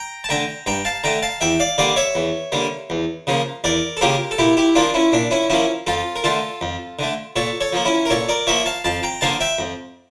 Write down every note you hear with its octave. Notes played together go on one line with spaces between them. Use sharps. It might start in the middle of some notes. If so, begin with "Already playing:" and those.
Already playing: G5 A#5
A5
D3 A3 G5 A#5
G2 G5 A#5
F5 A5
D3 A3 G5 A#5
F5 A5
E2 E5 G5
D5 F5
D3 G3 A#3 D5 F5
C#5 E5
E2
D3 G3 A#3
E2
C#3 F3 A#3
E2 A#4 D5
A4
C#3 F3 A#3 G4 A#4
A4
A#2 E4 G4
E4 G4
F3 A#3 D4 F4
C#4 E4
A#2 D4
C#4 E4
F3 A#3 C#4 E4
F2 F4 A4
A#4
D3 A3 F4 A4
F2
D3 A3
A#2 A4 C#5
A4 C#5
F3 A#3
C#4 E4
A#4
A#2 A4 C#5
A#4 D5
F3 A#3 C#5 E5
F5 A5
F2 F5 A5
G5 A#5
D3 F3 A#3 F5 A5
E5 G5
F2